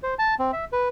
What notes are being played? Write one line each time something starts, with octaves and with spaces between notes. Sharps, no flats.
C5
A5
C4
E5
B4